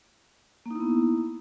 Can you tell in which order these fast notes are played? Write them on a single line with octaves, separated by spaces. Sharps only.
A#3 D#4 E4 B3